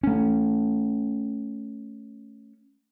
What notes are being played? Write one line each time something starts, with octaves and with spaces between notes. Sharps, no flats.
A3 C#4